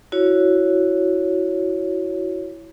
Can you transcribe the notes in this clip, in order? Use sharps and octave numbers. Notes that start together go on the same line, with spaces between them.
E4 F#4 C#5